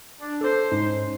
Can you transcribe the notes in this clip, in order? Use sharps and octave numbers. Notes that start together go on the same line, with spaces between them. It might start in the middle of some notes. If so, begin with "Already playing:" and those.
D4
A4 C5
G#2 C#4 D#4